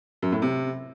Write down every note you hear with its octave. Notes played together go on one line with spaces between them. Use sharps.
F#2
A2
C3